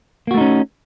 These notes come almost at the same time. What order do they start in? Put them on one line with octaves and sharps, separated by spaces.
A#3 F#4 A3 D#4 C#4